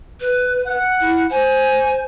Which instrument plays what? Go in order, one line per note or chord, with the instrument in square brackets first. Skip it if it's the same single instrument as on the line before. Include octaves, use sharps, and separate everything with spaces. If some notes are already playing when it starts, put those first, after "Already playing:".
[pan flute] B4
[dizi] F#5
[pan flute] E4
[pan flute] C5 [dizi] G#5